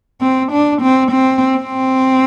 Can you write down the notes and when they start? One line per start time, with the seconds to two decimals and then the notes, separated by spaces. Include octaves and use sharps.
0.21 C4
0.52 D4
0.82 C4
1.12 C4
1.57 C4